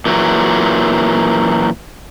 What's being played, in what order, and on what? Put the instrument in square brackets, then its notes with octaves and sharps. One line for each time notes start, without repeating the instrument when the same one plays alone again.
[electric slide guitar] A#2 E3 F#3